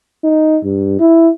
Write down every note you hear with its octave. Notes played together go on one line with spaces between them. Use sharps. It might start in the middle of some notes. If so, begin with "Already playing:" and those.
D#4
G2
E4